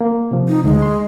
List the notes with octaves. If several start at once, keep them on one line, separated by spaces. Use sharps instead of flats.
A#3
C3 F3
D#4
D2 G#3
C6